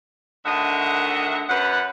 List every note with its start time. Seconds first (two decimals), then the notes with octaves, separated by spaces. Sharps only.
0.46 D2 D3 D#3 D#5 E5 F#5
1.49 F#2 B4 F#5